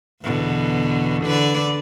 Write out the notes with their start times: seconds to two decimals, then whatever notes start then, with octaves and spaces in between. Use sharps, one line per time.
0.22 E2 B2 D3
1.25 D3 B4 D5